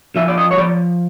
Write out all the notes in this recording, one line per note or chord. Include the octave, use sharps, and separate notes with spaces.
F3 E5
D5
D#5
C#5
F3 D5